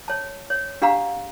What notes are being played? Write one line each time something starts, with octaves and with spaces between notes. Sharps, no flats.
C#5 A5
C#5
D4 G4 F5 F#5 A#5